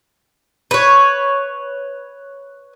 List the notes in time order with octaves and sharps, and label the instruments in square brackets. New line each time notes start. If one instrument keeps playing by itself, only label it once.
[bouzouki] B4 C#5